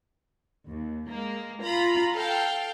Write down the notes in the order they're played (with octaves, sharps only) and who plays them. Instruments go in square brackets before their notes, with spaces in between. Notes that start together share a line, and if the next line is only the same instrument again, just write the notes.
[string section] D#2
G#3 A#3
F4 A#5 B5
A4 F5 G5